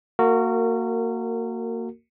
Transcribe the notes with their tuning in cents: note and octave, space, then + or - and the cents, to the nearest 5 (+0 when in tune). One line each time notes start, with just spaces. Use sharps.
A#3 -20 F#4 +0 A#4 -30